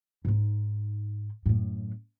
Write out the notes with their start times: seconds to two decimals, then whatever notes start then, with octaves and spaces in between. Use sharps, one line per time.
0.25 G#2 D#4
1.46 F#2 A2